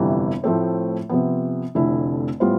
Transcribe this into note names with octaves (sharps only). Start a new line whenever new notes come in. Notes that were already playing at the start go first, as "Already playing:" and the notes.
Already playing: G1 F2 C3 E3 G3
A2 F3 A3 C4
C3 F3 B3
F1 F2 D3 A3 E4
A2 G3 B3 F4 C5